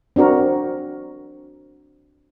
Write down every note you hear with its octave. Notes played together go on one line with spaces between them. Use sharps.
C4 D4 F#4 A#4